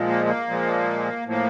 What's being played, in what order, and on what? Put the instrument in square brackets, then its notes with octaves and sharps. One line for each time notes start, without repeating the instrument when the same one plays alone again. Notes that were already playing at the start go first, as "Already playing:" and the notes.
Already playing: [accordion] A#2 F3 G#3
A#3
A#3
A#2 F3 G#3
A2 F3 A#3